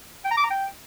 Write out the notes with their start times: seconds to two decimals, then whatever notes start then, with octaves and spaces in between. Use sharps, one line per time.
0.25 G5
0.31 A#5
0.37 D6
0.44 A#5
0.50 G5